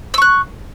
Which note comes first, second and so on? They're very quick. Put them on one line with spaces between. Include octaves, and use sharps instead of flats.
E6 C#6 F#6